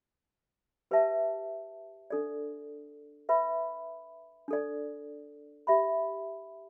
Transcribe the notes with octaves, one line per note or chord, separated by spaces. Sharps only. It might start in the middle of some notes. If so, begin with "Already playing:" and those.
G4 B4 E5 A5
D4 A4 D5
B4 E5 B5
D4 A4 D5
G4 E5 B5